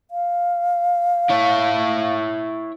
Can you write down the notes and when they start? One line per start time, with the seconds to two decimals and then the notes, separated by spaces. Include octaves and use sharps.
0.11 F5
1.29 E4 C#5